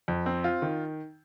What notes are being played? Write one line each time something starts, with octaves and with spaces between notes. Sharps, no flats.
F2
C4
F4
D#3